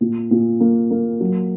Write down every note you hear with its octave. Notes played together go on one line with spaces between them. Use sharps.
A#2
A#2
A#3
A#3
F#3